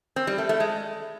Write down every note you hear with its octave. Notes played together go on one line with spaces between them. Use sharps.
C4
G3
A3
A3
G#3